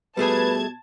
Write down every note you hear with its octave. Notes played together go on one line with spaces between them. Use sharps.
B2 G3 A3 G#4 B4 A5 G#6